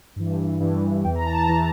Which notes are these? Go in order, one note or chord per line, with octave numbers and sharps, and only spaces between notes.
G2 E3
G2 E3
E2 E3 G5
A#5
A5
A#5
E3